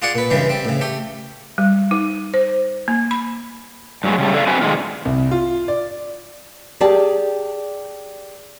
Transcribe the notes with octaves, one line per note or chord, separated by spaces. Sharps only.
F4 F#4 G#4 D5 F#5
A#2 B4
G2 C#3 E3 G3 G#3
G3 C4
A2 C#3
A3 G4
G3
D#4
C5
A#3
B5
G2 F#3 G#3
C#3 G3 A3
A4 D5 E5 F5
C4 D4 F#4 B4 C5 G#5
A2 C3 D#3 G#3 D4 F4
C2
F4
D5
G4 G#4 D5 G5 A5